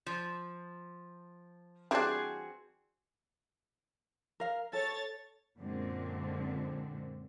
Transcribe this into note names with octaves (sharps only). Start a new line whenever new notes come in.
F3
E3 G3 C4 D4 F#4 G#4
A#4 F5
A4 C#5 A6
F#2 A#2 D3 G#3 C4